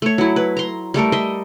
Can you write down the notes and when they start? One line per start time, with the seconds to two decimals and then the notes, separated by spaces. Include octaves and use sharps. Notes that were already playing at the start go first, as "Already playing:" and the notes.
0.02 A3 C#5
0.18 F#3 E4
0.36 B4
0.57 A#5 C6
0.94 G3 A3 A4 A#4
1.12 D#5 E5 C6